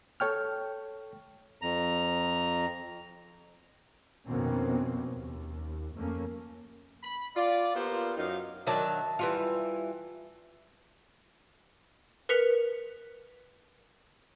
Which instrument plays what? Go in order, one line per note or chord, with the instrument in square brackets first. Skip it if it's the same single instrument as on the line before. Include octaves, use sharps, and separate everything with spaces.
[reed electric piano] A4 C#5 G5 F6
[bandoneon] F2 A#5
[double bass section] F2 B2 D#3 A#3 C4 C#4
D#2
F2 A3 A#3 C#4
[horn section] B5
F4 D5
A#3 B3 F4 G4 A#4 C5
F#2 D#4 F5
[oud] D#3 F#3 D4 [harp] E5 A5
[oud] E3 G3 F4
[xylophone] A#4 B4 B6 C#7 F7